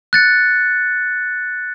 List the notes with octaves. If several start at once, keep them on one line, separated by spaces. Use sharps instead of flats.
F#6 A6 C#7